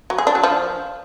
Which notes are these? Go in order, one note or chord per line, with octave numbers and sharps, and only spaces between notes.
F#3
G#4
D4
F#3
F3